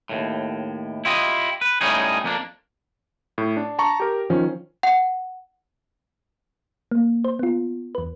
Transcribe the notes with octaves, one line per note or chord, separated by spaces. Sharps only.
D#2 A2
E4 F4 G4 D#5
B4
A2 G3 C#4 D#4 G#4
F2 A#3 D4
A2
D4
A5 A#5 C#6
G4 A#4
D#3 F3 C#4
F#5
A#3
C5
B3 F4
E2 B4